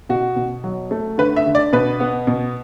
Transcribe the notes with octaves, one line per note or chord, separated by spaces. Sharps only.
B2 F#4
B2
F#3
A3
D3 B4
E5
D3
D5
B2 B4
B3
B2